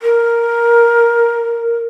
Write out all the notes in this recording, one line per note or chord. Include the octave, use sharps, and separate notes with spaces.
A#4